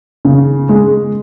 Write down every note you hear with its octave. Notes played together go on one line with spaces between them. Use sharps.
C#3
G#3